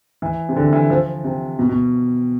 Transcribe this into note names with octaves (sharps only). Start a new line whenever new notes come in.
E3
C3
D3
E3
F3
C3
B2
B2